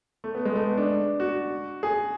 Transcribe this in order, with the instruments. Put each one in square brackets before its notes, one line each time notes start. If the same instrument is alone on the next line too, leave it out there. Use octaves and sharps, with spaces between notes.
[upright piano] A3
B3
G#3
A3
B3
D4
F#4
G#4